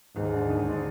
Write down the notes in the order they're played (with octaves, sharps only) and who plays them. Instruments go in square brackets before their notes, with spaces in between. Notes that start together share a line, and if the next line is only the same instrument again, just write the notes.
[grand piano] D#2 [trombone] G#2
[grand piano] D3 G#3 D4
D#2
D3 G#3 D4